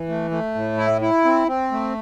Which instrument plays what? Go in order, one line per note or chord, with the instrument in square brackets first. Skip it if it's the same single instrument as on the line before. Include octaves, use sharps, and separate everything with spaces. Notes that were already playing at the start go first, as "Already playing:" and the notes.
Already playing: [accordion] E3
A3
A3
A2
E4
E4
C4
C4
A3